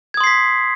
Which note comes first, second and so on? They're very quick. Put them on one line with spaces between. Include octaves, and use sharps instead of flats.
G#6 D#6 C6 C7 B6